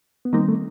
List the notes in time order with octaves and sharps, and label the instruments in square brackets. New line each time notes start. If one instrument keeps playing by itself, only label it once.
[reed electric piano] B3
[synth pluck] D#3 G3 C4 D#4 [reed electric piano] A#3
[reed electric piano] A3